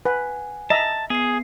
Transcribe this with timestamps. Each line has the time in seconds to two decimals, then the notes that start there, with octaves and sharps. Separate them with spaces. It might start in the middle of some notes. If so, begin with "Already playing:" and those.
0.05 B4 F#5 G#5
0.70 D#5 E5 A5 A#5
1.10 B3 G#4 C7